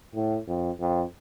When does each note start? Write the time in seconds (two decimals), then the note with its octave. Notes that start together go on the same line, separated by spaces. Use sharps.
0.15 A2
0.47 F2
0.80 F2